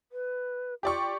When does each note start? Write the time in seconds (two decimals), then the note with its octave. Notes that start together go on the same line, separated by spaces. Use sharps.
0.12 B4
0.83 F4 G4 D5 C#6